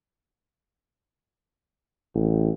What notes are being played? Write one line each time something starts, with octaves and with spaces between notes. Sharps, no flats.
A1